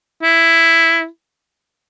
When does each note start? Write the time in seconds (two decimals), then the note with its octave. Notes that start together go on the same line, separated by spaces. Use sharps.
0.23 E4